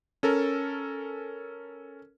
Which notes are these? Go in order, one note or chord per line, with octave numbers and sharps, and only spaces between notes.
C#4 A4 A#4